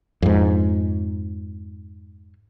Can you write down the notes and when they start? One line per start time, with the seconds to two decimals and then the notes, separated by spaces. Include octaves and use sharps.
0.22 F2 G#2